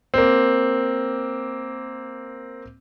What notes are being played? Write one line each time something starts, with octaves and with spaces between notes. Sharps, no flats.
A#3 C4